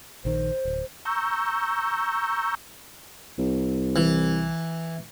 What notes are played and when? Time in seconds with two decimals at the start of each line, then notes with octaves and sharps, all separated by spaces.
0.25 A#1 D#3 C5
0.65 D1
1.05 A#5 C#6 E6 G6
3.38 C2
3.96 E3